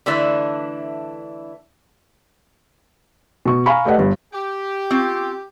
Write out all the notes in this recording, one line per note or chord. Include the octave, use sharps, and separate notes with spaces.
D3 E3 A3 D4 E4
B2 C#6
F5 G#5 A#5 B5 C#6
A3 G4 B4 D5 D#5 F#5
G1 G2
G4
C4 C#4 F4